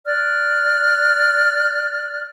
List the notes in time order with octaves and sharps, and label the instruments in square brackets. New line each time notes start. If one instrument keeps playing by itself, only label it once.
[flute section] D5 F6 F#6